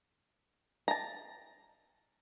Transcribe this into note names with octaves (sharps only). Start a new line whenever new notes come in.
A5 A#5